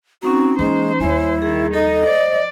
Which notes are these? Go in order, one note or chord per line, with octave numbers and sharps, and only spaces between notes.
C4 C#4 D#4 F#4 A#5
E3 G#3 A#3 C5
D#2 G3 E4 C#5 G#5
D#3 G#4
D#4 A4 D#5
C5 D5